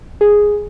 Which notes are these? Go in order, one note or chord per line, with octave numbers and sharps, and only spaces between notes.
G#4